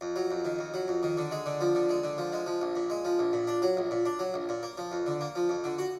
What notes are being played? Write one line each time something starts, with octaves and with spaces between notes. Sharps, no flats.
F2
F#3
F2
D#3
F2
F#3
F2
D#3
D3
G#3
D3
F3
D3
G#3
D3
F3
G#3
F3
A#1
A#2
G#3
F3
A#1
A#2
D4
F#3
A#1
A#2
D4
F#3
A#1
A#2
A#3
F3
F2
D3
A#3
F3
F2
D3
F#4